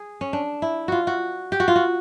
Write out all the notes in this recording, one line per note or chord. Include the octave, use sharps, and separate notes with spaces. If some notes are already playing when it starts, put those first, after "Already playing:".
Already playing: G#4
C#4
D4
E4
F4 F#4
F#4
G4
F#4
F4
F#4